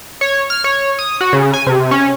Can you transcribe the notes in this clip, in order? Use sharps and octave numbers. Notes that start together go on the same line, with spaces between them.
C#5
F6
C#5
D#6
F#4
C#3
G#5
C3
C#4